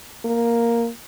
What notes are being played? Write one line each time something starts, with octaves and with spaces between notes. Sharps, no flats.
A#3